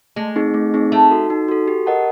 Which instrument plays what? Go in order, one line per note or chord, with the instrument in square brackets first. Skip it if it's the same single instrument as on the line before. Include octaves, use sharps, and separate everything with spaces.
[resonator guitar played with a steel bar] G#3 [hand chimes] A3
[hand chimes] C4 D#4 G#4
A3
C4 D#4 G#4
[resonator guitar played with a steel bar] A3 [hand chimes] D#4
[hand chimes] F#4 A4
D#4
F#4 A4
G4
A#4 D#5 F#5 A5